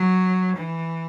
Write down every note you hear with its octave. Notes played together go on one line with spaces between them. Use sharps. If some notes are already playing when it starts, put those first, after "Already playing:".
Already playing: F#3
E3